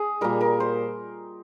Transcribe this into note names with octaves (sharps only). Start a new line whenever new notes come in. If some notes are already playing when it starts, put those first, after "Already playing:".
Already playing: G#4
A#2 G3 A#4
A#4
C5